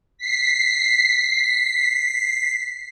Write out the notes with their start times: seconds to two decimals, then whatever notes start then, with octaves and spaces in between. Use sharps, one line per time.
0.18 B6 C7